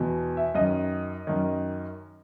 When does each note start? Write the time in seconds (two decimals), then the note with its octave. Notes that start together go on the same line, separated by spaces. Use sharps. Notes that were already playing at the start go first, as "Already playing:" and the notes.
Already playing: E2 B2
0.37 E5
0.55 F#2 D#3 D#5
1.27 F#2 D#3